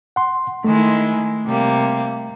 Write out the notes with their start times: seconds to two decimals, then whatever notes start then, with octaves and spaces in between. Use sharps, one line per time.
0.16 F#5 C6
0.64 D#3 G#3 A3 E4
1.46 C3 G3 A#3